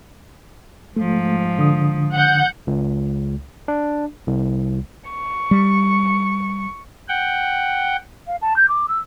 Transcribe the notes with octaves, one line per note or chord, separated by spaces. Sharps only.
G#2 F3 A3
D3 D#6
F#5 G6
C#2
D4
C2
C#6
G3
F#5 G5
F5
A5
G6
D6
E6